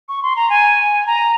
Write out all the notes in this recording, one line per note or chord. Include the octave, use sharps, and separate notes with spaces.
C#6
C6
A#5
G#5
A#5